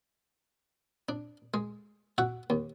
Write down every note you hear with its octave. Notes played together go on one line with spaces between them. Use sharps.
D4
G#3
F#4 E5 F#5
D#2